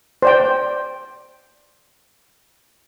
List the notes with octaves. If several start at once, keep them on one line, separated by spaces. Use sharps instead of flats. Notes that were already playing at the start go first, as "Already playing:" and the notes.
C5 D5 G5